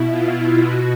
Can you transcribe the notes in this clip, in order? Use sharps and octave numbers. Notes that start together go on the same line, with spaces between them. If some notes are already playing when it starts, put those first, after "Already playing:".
Already playing: B2 E4
F4
B2 F#4